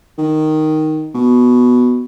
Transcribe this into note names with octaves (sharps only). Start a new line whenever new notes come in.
D#3
B2